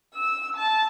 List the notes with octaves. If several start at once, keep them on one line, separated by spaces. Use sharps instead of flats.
E6
A5